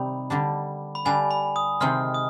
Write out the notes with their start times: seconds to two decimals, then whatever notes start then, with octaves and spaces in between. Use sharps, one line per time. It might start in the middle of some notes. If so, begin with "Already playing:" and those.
Already playing: C3 D#3 G3 C4 D#4 B5
0.30 D3 G3 D4
0.95 B5
1.05 D3 G3 D4 G#5
1.31 B5
1.56 D#6
1.80 C3 D#3 G#3 C4 F6
2.14 D#6